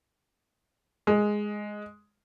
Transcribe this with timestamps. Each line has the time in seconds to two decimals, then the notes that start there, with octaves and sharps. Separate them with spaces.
1.07 G#3